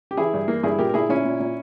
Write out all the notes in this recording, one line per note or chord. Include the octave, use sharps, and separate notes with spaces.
G4
E3 E4 G#4
G2
E3 A#3
G2 E4 G#4
A#2 G4 A#4
A#4
A#2 E4 G#4
A#2 C#4 E4
A#2
A#2